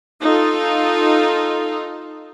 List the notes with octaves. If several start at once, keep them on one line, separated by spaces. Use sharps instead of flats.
D#4 F4 A4